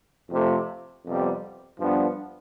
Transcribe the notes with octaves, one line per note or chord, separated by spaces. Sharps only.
F2 C3 F3 A3
F2 C3 G3 B3
G2 F3 B3 D4